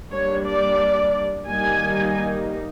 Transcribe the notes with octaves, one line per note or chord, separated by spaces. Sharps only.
G3 A#3 D4 C#5
D5
D#3 G3 A#3 D#4 G#5